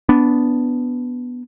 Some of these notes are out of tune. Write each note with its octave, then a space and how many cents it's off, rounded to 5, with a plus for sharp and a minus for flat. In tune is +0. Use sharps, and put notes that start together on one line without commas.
B3 +0 D4 -10